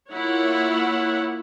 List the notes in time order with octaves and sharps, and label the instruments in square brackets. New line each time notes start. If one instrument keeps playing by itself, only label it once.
[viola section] A#3 E4 F4 C#5 F#5